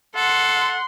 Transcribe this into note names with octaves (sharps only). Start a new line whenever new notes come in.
A4 F#5 C6